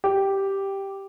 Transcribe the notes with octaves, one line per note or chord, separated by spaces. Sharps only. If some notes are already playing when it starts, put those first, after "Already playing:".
G4